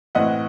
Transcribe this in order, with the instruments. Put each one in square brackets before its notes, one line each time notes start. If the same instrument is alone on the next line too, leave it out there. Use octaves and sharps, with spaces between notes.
[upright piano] A2 E3 C4 D#5 F#5